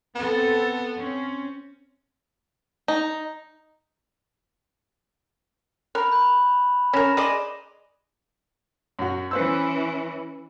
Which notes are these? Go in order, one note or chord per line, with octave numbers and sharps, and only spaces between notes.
B3 C4 A4
C4 C#4
D#4
A#4 B5 F#6 F7
B5 G6
C#4 A#4 A#6 E7 F7
G#4 D5 D#5 G#5 C6 G7
F#2 F#4
E3 C#4 B4 C5 E6